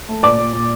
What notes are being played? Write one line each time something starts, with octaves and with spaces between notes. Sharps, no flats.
A3
A#2 D5 D6
A#2
A#2